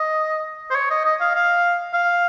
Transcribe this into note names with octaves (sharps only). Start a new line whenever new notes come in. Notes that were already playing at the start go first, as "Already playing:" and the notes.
Already playing: D#5
C5
C#5
D#5
D#5
F5
F5
F5